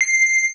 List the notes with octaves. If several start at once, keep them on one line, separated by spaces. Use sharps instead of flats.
C7